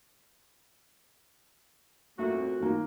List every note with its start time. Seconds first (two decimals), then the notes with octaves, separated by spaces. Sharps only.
2.19 A#2 A3 A#3 F#4 E5
2.34 C4
2.60 D#3 A#3 F4